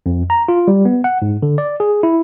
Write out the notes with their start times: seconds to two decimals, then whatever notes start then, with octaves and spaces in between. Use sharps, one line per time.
0.06 F2
0.30 A#5
0.48 F4
0.68 G3
0.85 B3
1.04 F#5
1.22 G#2
1.43 D3
1.58 D5
1.80 G#4
2.03 E4